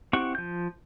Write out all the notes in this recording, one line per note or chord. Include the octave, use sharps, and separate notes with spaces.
C4 E4 G4 F#5 C#6
F3 G6